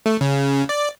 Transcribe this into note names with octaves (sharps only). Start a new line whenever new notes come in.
A3
C#3
D5